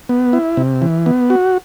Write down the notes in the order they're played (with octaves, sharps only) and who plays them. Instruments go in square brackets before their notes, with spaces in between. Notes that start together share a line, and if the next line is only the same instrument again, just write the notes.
[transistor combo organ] B3
E4
C3
E3
B3
F#4